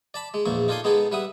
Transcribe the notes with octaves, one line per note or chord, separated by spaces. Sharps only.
D5 A5 B5
G#3
A#1 E2 A#2 A#3 C#6
D#4 F4 A4 D5 G#5 C6
G#3 B3 D#4 G#4 A4
G3 B4 E5 F#5 D#6